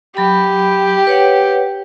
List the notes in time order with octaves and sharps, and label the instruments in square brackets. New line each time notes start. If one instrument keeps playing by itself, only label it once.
[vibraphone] F#3 B5 [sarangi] G4
[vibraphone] B4 C#5 F#5